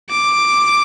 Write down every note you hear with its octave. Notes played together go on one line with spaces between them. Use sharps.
D6